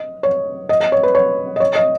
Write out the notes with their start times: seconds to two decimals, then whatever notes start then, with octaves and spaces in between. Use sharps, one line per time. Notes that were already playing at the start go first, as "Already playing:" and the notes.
Already playing: D#5
0.23 C#5
0.69 D#5
0.80 D#5
0.92 C#5
1.03 B4
1.15 C#5
1.56 D#5
1.60 C#5
1.76 D#5